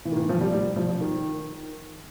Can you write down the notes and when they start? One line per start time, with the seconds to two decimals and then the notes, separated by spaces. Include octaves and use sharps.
0.05 E3
0.12 D#3
0.17 E3
0.29 F3
0.41 G3
0.52 G3
0.76 F3
1.01 D#3